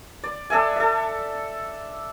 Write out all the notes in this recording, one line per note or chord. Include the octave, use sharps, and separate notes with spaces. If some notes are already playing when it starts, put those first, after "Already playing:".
D5
D4 A4 E5 G#5
A4 E5